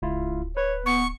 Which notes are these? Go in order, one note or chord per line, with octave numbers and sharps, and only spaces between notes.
D1 C#2 E4 F4
B4 C#5
B3 C#6